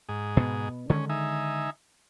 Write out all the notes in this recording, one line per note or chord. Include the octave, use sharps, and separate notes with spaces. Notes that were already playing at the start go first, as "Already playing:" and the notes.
G#2 G#4
B2 B3
D3 D#3 G#3 C#4
D#4 E5 G#5